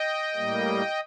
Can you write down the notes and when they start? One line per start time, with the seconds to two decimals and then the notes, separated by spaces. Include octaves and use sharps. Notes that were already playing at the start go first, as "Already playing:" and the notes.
Already playing: D#5 G5
0.35 A2 G3 A#3